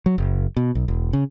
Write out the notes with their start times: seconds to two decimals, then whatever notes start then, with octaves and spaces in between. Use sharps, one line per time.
0.06 F#3
0.18 F#1
0.57 B2
0.75 B1
0.88 E1
1.13 C#3